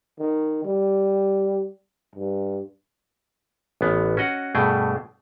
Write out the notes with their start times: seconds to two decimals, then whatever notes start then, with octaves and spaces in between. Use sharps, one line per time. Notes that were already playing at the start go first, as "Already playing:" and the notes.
0.20 D#3
0.65 G3
2.16 G2
3.81 A1 B3
4.17 C#4 F#4 D#5 F#5
4.55 G2 B2 A3 G#4 G5